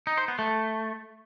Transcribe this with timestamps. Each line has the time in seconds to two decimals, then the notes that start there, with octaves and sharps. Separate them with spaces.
0.07 D#4
0.18 C5
0.28 B3
0.39 A3